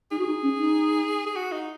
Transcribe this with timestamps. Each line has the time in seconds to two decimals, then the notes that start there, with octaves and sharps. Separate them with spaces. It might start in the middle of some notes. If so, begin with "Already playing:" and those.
0.11 D#4 G#4
0.19 F#4
0.27 D#4
0.43 C#4
0.59 D#4
1.26 G#4
1.36 F#4
1.52 D#4